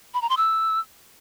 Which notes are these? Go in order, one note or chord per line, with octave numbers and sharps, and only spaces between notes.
B5
A#5
C6
E6